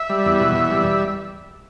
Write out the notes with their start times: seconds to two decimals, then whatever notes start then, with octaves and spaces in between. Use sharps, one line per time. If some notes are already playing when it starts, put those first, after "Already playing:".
Already playing: E5
0.10 G3
0.26 E2
0.40 B2
0.55 E2
0.71 G3